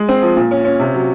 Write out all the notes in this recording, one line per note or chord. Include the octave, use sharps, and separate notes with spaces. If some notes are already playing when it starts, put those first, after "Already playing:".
Already playing: G#3
C4
F3
A#2
C#4
C#4
C3
F#3